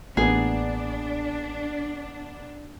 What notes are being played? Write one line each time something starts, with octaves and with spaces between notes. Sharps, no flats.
A1 A#3 B3 D4 G#4